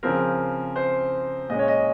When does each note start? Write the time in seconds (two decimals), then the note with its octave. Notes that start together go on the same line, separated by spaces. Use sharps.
0.03 C#3 F3 C4 A#4
0.76 C5
1.49 A#2 G#3 C#4 D#5
1.59 C#5
1.68 D#5